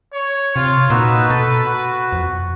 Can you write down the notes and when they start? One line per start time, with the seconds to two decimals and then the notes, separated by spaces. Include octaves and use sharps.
0.13 C#5
0.56 C3 F4 C#5
0.90 A#2 D#4 F#4 B4 E6
1.30 B2 A4 A5
1.65 F#4
2.13 F2